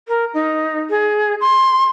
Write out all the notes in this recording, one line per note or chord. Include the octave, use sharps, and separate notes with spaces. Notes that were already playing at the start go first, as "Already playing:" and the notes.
A#4
D#4
G#4
C6